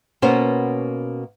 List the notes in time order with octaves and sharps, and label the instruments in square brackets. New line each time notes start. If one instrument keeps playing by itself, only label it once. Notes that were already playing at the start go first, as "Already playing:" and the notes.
[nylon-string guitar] B2 A#3 B3 C#4 C5